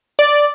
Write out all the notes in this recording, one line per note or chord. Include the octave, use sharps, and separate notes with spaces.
D5